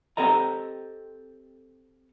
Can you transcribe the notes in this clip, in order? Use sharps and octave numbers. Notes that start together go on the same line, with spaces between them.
C4 G4 A4 D#5 A#5